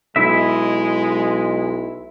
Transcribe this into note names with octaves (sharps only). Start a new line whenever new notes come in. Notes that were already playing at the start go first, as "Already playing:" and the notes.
B1 G#3 E4 E5